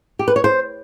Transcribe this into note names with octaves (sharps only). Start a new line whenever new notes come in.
G4
B4
C#5
C5